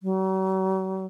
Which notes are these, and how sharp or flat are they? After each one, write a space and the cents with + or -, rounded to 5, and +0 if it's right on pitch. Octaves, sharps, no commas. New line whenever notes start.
F#3 +45